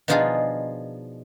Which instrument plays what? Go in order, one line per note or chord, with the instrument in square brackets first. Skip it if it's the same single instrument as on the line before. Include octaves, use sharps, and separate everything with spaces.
[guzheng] B2 F3 D4 D#4 F4 G#4